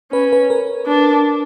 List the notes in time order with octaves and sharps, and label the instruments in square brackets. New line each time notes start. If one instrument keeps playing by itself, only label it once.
[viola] C#4 [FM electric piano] B4
[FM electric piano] B4
A#4
[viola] D4